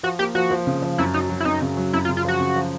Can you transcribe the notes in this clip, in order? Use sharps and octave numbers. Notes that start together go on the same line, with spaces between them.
F3 F#4
A#3 G4
F3 F#4
F3
C#3
F3
F#2 E4
F#3 D#4
F#3
E4
F#2 D#4
C#3
F#3
F#2 E4
F4
C#3
F4
F3 F#4
C#3
F3